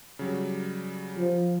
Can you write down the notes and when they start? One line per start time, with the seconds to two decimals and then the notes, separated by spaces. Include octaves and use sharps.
0.19 C#3 F#3 G3
1.17 F3